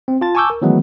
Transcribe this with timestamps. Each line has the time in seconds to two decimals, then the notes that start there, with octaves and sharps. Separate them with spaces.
0.08 C4
0.21 F4 A5 A6
0.35 G#5 A5 C#6 D6 E6 G6
0.50 A#4
0.62 D#3 E3 F#3 G#3 A3 B3